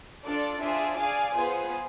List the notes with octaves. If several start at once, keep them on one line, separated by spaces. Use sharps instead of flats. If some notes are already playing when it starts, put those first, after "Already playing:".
D4 F4 A4 D5
D4 F4 G#4 C5 E5
G#4 D5 F5 G#5
B3 F4 G#4 C5